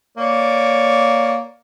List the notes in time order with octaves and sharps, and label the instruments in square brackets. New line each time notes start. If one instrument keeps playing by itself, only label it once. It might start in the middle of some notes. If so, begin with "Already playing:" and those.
[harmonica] A#3 C#5 D5